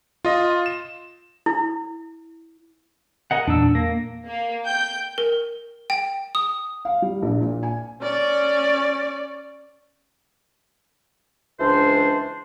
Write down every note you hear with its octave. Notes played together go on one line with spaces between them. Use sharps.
F4 D#5
E7
E4
A#4 D#5 F#5
E2 A#2 D4 E6
A#3 A#6
A#3
G5 G6
A#4
G5
D#6
F5
G3
A#1
A#2
G#5
C#4 D5
C#2 E3 D4 C5